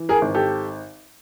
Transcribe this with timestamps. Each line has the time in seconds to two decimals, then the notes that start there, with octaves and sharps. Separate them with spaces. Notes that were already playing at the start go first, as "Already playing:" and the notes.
Already playing: E3
0.09 G#4 A#4
0.22 G#1
0.34 G4 A4